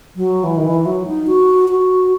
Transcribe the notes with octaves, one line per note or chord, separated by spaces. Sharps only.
F#3
E3
D#3
E3
F#3
D#4
F#4
F#4